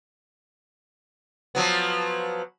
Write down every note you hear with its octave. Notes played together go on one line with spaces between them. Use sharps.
F3 F#3 B3